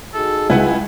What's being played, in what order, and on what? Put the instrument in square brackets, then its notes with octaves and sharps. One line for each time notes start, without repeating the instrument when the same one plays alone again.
[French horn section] D#4 F#4 G#4 [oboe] A4
[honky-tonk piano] C#2 [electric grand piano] E4 B4 F#5 [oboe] G#5